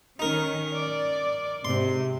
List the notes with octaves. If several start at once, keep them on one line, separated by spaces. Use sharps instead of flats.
D#3 C#4 D#4 A#4
D5
G#2 C3 C6